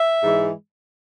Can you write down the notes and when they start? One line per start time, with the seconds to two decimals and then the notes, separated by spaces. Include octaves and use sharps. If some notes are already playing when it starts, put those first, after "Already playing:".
Already playing: E5
0.23 G#2 E3 G#3